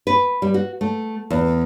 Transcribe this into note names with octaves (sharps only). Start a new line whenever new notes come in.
B4
G3
F#4
A3
E2